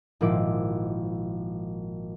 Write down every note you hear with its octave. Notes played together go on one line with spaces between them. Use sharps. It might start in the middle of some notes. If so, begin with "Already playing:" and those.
G#1 A#2 F3 E4 D6